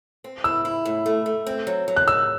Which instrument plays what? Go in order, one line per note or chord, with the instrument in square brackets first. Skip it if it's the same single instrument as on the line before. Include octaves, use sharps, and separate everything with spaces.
[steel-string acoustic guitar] C4
[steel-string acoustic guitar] E4 [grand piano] E6
[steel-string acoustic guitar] E4
A2
A3
A3
C4
F#3
F#3
[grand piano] F#6
[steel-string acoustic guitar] D#4 [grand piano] E6